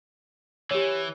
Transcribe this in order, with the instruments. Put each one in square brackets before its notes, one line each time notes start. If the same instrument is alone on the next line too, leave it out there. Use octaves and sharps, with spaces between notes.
[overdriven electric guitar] E3 [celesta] G4 C#5